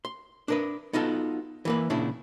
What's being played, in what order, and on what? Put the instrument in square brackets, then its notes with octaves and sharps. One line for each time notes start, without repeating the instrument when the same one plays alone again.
[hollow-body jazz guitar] C6
D4 A#4 B4
B3 D#4 F4 F#4 A4
E3 A#3 B4
A#2 C#3 D4 E4